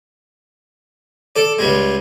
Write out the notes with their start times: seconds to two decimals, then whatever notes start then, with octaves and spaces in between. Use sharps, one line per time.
1.36 A4 D5
1.59 C#2 G3 G#3